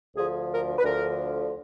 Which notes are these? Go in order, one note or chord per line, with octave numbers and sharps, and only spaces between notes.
D2 D3 F3 G#4
A#4
B4
D2 D3 F3 A#4